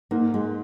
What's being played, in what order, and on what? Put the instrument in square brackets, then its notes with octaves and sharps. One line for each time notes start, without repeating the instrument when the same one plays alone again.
[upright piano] G#2 [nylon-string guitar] A#3
[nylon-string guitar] G#3